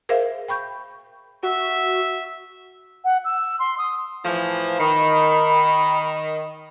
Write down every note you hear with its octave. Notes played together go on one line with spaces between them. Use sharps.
G#4 A#4 C5 E5 F5
G5 B5 C#6 G6
F#4 E5
F#5
E6
C6
D#6
A2 E3 F3
D#3 B5